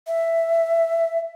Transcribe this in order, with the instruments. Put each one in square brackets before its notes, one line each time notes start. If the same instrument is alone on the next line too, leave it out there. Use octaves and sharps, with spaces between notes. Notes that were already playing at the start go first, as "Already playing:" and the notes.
[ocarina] E5